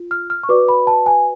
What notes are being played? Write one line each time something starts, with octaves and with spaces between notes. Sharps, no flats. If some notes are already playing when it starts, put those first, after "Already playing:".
Already playing: F4
F6
F6
C#6
F#4 B4 D5 D6
B5
A5
G#5